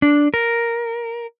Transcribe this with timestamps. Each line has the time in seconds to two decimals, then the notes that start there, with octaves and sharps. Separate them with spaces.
0.02 D4
0.34 A#4